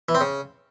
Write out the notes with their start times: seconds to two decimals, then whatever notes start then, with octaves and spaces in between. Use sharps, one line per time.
0.09 E3
0.15 C4
0.21 C#3